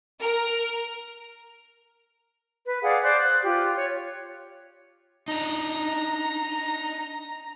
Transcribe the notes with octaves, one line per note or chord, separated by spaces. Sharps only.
A#4
B4
G#4 D5 F5 F#5
C5 D5 F#6
F#6
F4 G4
C#5
D4 D#4 A#5